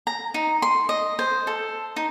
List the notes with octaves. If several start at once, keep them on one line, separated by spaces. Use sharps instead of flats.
A#5
D#4
C6
D#5
C5
A4
D#4